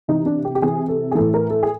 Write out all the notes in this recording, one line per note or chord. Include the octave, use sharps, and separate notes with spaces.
C3 E3 D#4
D4
G4
G4
C3 E3 G#4
A4
G#4
A2 E3 A4
A#4
A4
G#4